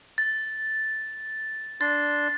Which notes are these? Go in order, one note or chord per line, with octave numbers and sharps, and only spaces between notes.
A6
D4 C6 A6